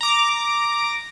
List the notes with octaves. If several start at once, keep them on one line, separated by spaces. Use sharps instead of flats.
A#5 D6